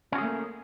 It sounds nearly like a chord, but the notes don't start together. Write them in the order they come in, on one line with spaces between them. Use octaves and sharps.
C#4 F#4 G#4 A3 A#3